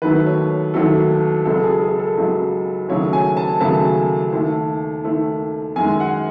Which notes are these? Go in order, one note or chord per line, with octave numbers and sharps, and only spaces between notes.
D#2 D#3 F#3 A3 B4
C#5
D#2 D#3 F#3 A3 A4
C#2 C#3 F#3 A4
G#4
G#4
A4
C#2 C#3 F#3
D#2 C#3 F#3 A3 C#5
G#5
A5
D#2 C#3 F#3 A3 A5
D#2 D#3 A3
D#2 D#3 A3
F#2 D#3 G#3 G#5
F#5